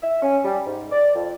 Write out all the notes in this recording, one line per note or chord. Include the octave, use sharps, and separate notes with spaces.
E5
C#4
G3
G#2
D5
F2